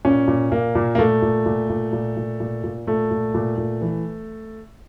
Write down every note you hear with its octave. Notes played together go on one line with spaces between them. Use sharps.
A#2 C#4
A#2
A#2 A#3
A#2
A#3
A#2 A3
A#2
A#2
A#2
A#2
A#2
A#2
A#2
A#2 A3
A#2
A#2
A#2
E3